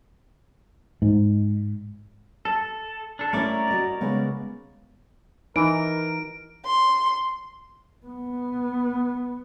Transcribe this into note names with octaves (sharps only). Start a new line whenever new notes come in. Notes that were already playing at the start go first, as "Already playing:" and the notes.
G#2
A4 A5
D4 A4
A3 C#4 E4 A#4 C#5 D5
F#4 D#5
C#3 G#3 B3
E3 D#4 A#4 D7
C6
B3